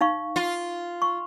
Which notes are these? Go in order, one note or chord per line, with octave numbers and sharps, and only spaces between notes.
D#4 F5 C#6
F4
C#6